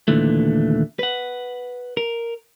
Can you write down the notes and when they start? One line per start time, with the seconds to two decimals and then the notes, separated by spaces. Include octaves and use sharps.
0.08 D#2 A#2 D3 E3 A3
0.99 B4 F#5
1.97 A#4